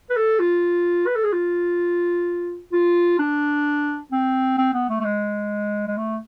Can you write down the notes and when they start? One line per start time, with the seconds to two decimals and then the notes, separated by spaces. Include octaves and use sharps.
0.10 B4
0.16 A4
0.39 F4
1.06 B4
1.15 A4
1.24 G#4
1.33 F4
2.72 F4
3.19 D4
4.12 C4
4.58 C4
4.73 B3
4.89 A3
5.00 A3
5.04 G#3
5.87 G#3
5.97 A3